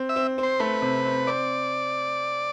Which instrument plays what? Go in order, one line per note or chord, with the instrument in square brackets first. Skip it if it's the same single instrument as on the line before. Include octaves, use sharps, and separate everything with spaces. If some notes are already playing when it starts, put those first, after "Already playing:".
Already playing: [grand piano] C4
[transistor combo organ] E5
[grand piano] C4
C4
[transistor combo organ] C5
[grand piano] A3 [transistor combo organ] B4
[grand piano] C3
C4
[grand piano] C4 [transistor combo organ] D5